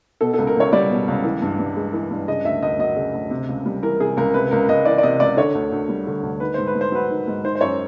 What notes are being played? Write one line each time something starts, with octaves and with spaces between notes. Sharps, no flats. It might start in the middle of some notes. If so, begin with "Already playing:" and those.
B2 A4
A4
C#2
A#4
C#2 C#5
G3 D5
B2
C#2
E3
G2
G2
G#3
E3
G2
C#3 D#5
D2 E5
D2 D#5
F#3 D#5
C#3
D2
C3
C#2
G3
E3 A#4
C3 G#4
C#2 A#4
C3 B4
C#2 A#4
C#2 D#5
E3 D5
D5
C3 D#5
C#2 D5
D3 C#5
D2
D2
G3
D3
D2
D#3 B4
G#2 C5
B4
G#2
C5
F#3 B4
D#3
G#2
D#3 C5
C5
F#2 C#5